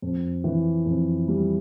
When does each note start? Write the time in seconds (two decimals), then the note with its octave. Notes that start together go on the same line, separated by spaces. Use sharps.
0.02 F2
0.44 E3
0.86 F2
1.28 G3